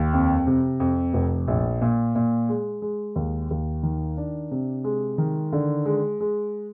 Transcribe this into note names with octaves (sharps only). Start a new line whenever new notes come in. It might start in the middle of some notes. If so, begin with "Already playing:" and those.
Already playing: D#2
F2
C3
F2
F1
A#1
A#2
A#2
G#3
G#3
D#2
D#2
D#3
D4
C3
G#3
D#3
D3
G#3
G#3